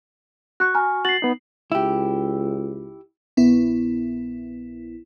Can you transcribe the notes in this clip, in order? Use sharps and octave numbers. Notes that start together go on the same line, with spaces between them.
F#4 C#6 F#6
G#5 A#5 F6
F#4 A6 C7 F#7
B3 D#4
C#2 E4 G4
A#1 B3 E4